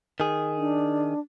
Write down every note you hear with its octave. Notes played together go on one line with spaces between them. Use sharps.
D#3 G#4
D4